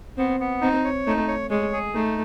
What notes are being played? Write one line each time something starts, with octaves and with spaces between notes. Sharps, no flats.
B3 C4
B3
C4 D#4
C#5
A3 D#4
C#5
G#3 C#5
G#4
A3 D#4